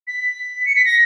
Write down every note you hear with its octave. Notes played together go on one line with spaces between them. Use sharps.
B6
C#7
B6
A#6